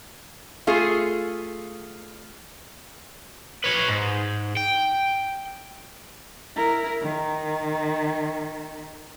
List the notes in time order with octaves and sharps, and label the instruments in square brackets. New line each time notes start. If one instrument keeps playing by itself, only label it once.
[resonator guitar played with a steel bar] A3 F4 G#4
[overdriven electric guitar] B4 C#5
G#2
G5
[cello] E4 A#4
D#3